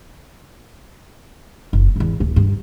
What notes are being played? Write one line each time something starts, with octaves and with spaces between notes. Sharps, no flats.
F#1
G#1 E2
D1
G2 D3